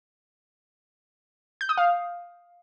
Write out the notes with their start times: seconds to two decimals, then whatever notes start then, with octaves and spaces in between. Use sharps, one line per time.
1.61 G6
1.69 D#6
1.78 F5